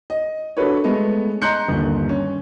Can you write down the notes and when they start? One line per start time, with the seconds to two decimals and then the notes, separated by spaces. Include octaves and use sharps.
0.10 D#5
0.57 D4 F#4 A4 B4 C#5
0.84 G#3 A3 B3 D#5
1.42 D#5 A#5 C6 F#6 G6 C#7
1.69 G1 D#2
2.09 C#4